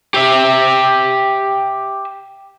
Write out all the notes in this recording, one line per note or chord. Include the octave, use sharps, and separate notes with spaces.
G4 E5